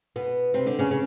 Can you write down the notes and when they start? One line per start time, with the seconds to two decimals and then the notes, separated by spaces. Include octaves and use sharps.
0.16 B2 B3
0.54 C3 C4
0.66 D3 D4
0.79 C#3 C#4
0.91 C#3